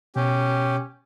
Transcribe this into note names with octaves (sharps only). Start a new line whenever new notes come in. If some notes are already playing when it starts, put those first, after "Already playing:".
B2 C#4 G4